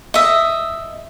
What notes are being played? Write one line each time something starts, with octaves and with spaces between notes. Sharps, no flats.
D#5 E5